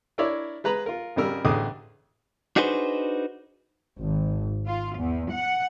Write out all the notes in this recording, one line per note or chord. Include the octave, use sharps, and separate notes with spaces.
D4 E4 A#4 C#5 D5 E5
G#3 B4 A#5 B5
F4 A#4
G#1 C#3 G3 A#4 E6
A1 D3 G#4 D6 D#6
D4 D#4 F#4 G#4 B4 C5
G#1
F4
E2
F#5